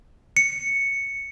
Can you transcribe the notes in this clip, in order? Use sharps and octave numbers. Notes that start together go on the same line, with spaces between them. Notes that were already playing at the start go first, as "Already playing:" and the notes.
C#7